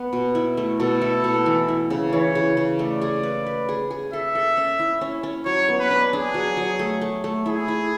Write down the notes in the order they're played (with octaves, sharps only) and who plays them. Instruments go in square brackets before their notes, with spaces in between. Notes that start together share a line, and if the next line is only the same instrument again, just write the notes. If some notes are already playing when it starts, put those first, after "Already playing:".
Already playing: [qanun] B3 B4
B2
E4
A3
[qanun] B2 [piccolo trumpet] A4
[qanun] E4
B2
E3
E4
C#3
[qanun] E3 [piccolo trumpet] C#5
[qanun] C#3
C#3
[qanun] A3 [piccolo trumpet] D5
[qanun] G#4
B4
B4
G#4
G#4
[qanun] A4 [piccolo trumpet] E5
[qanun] A4
C#4
E4
C#4
C#4
[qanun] F#3 [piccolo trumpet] C#5
[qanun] B3
[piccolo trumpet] B4
[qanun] D4
[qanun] D4 [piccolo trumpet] G#4
[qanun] F#3
F#3
A3
A3
A3
[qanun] E4 [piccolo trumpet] G#4
[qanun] E4